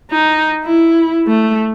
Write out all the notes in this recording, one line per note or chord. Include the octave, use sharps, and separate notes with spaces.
D#4
E4
A3